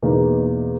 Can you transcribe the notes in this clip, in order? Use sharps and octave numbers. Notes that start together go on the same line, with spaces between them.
E2 B2 A#3 D#4